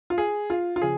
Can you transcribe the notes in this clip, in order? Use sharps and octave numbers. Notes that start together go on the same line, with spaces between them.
F4
G#4
F4
F4
C#3 F3 G#4